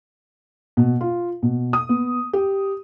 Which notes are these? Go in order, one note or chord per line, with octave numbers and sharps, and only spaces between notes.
B2
F4
B2
D#6
B3
G4